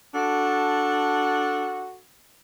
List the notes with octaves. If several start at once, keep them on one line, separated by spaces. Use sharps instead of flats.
D4 F#4 A4